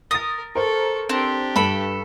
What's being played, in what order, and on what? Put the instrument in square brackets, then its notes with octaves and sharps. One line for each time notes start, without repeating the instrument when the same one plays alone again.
[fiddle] A#4 [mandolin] D#6 [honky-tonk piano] A6 A#6
[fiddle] A4 C#6 [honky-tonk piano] A#4 C5
[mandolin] C4 [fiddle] D4 G4
[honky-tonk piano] G2 [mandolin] A4 B5